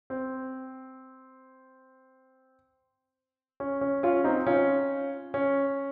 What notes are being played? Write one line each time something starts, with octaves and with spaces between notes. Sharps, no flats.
C4
C#4
C#4
C#4 F4
C4 D#4
C#4 F4
C#4